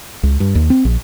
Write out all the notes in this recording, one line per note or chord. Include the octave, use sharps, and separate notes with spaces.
C#2
G2
D#2
C4
A#1